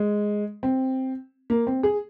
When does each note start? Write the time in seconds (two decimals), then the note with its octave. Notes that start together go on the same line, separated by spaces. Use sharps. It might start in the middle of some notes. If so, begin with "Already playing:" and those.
Already playing: G#3
0.63 C4
1.50 A#3
1.67 C4
1.83 G#4